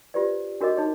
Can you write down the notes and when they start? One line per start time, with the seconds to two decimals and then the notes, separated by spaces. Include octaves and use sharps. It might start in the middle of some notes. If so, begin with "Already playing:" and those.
0.14 F4 G4 B4 C5 D5
0.61 D4 F#4 A#4 C#5 D#5 D6
0.77 D#4 C#5